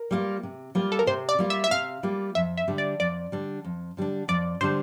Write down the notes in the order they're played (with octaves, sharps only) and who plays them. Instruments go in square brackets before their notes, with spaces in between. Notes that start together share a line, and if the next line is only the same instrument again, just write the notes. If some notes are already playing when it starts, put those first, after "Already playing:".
Already playing: [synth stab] A#4
[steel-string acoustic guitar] G3 A#3 F4
C3
G3 A#3 F4
[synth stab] A4
A#4
[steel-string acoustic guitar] C3 [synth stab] C5
[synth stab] D5
[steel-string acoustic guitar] G3 A#3 F4
[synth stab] E5
E5
[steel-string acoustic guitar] C3 [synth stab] F5
[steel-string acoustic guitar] G3 A#3 F4
[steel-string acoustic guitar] F2 [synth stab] E5
[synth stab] E5
[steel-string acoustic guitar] D3 G3 D4
[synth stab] D5
[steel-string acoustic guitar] F2 [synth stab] D5
[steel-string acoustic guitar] D3 G3 D4
F2
D3 G3 D4
[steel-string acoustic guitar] F2 [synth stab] D5
[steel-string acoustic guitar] D3 G3 D4 [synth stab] C5